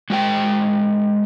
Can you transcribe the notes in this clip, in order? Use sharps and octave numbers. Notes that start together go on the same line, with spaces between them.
G#3 F#4 C5 G5